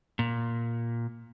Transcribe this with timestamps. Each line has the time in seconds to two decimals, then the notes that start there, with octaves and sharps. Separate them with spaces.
0.19 A#2